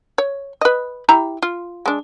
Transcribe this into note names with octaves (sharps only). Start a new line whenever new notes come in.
C#5
B4 D#5
E4 G4 A#5
F4
G#3 D4